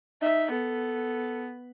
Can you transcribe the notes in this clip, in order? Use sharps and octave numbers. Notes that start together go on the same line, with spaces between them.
D#4 E5
B3 A4